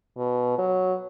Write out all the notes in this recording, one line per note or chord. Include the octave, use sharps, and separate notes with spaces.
B2
F#3